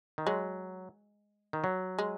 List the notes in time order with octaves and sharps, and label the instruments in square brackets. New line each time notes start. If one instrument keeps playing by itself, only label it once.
[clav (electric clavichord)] D#3
[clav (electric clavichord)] F#3 [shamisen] G#3
[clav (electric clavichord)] D#3
F#3
[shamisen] G#3